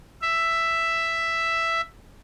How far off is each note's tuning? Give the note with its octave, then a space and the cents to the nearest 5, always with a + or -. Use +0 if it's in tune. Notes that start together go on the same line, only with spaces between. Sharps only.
E5 +5